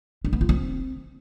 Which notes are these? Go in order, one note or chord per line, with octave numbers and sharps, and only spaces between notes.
D4
B3
F4
C4